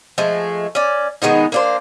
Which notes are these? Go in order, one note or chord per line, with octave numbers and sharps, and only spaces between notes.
F3 G#3 A3
C#4 D5
D#3 G#3 B3 D#4
A#3 D4 C5